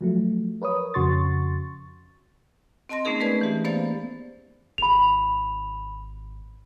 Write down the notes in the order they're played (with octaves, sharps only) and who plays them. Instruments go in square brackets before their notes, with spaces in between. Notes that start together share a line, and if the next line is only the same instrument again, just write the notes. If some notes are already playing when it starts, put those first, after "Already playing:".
[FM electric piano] F3 F#3 A3
A#4 B4 C#5 D#6
F2 C#3 F#4 C6 C#6 A6
[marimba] C4 D#5 A5 C6 A#6
A3 B3 C#4 D#4 G#4 A#4
G#3 A3 B4 D5 A5 G#6
E3 G4
A#3 B3 C5 D5 F5 A6
[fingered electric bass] G#1 [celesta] B5 F7